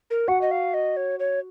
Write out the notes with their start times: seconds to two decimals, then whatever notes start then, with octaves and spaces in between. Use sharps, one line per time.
0.10 A#4
0.28 F#4 F#5
0.41 D#5
0.51 F5
0.74 D#5
0.97 C#5
1.19 C#5